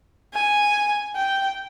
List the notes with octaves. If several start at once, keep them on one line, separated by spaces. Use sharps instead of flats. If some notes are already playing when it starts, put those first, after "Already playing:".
G#5
G5